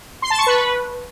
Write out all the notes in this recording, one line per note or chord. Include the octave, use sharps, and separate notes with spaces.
C6
A5
C#6
B4